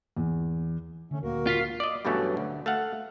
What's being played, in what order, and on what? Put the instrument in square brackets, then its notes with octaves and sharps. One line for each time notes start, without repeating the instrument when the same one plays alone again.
[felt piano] E2
[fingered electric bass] D3 [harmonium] A3 C#4
[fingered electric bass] D2 A#2 [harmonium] A#3 F#4 A#4
[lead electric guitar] F4 [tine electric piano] F6 B6 C7
[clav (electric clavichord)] D5 D#5
G2 B2 E3 F#3 A3 C#4
D2
A3 F5 F#5